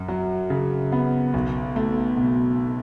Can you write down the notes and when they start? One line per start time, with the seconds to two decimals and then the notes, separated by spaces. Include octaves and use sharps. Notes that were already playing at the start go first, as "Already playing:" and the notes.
Already playing: F#2
0.08 F#3
0.50 C#3
0.92 B3
1.33 B1
1.76 A3
2.17 B2